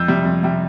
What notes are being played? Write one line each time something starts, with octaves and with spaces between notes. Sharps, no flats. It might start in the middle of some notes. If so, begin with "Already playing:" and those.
Already playing: F2 E6 G6
C3 G3
F2
C3 G3